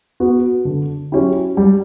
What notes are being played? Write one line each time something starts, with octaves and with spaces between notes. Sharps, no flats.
B3 F#4
D3
F#3 C#4 E4 G4
G3